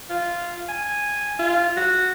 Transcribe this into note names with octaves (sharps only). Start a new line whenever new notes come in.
F4
G#5
F4
F#4